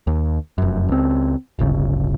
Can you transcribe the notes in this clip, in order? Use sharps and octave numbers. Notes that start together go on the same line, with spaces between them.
D#2
F1 F#2
C#2 C4
D1 G1 C#3